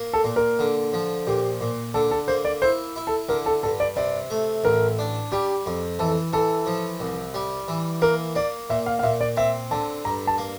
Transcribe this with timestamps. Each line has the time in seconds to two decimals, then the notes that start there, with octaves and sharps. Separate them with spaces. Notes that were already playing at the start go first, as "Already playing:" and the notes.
Already playing: A#3
0.13 A4
0.24 A#2
0.36 A#4
0.59 D3
0.93 F3
1.27 A#2 G4
1.61 A#2
1.94 D3 A4
2.11 A4
2.28 A#3 C5
2.45 D5
2.62 E4 C5
2.96 E4
3.07 A4
3.29 D3 A#4
3.46 A4
3.63 G2 A4
3.80 D5
3.96 C3 D5
4.30 A3
4.64 A1 A#4
4.99 D4
5.32 G3 G4
5.66 F2
5.99 E3 A4
6.33 E3 A4
6.66 F3
7.00 C2
7.34 G3
7.68 E3
8.02 A#3 A#4
8.35 A#3 D5
8.70 A#2 E5
8.86 F5
8.99 F5
9.03 A#2 E5
9.21 D5
9.37 C4 E5
9.71 D3 A5
10.05 G2 A#5
10.27 A5
10.38 A#3